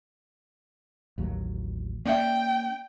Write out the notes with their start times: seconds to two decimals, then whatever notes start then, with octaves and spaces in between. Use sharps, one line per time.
1.18 A1 D#2 F#3
2.05 A#3 C#4 D5 E5 G5